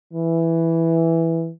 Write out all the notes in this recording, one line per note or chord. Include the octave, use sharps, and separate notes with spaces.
E3